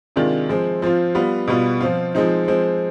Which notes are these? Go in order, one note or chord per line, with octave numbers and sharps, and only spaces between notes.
C3 D#3 G#3 D4 F4
F3 G#3 C4
F3 C4 F4
G3 B3 F4
B2 G3 B3 F4
F3 C4 F4
F3 G#3 C4 D#4
F3 G#3 C4